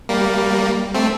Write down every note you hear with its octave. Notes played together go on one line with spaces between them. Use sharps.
G3 A#3
A3 C4